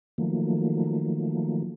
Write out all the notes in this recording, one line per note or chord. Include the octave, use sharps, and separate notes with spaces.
D#3 F3 F#3 A3 A#3